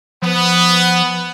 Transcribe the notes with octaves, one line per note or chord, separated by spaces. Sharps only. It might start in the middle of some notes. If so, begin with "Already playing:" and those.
F3 B3